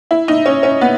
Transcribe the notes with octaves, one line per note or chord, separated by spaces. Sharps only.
E4
D#4
C#4
C#4
B3